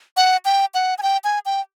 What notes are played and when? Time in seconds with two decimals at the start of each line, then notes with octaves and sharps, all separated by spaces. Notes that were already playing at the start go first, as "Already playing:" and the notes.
0.17 F#5
0.45 G5
0.74 F#5
0.98 G#5
1.03 G5
1.24 G#5
1.46 G5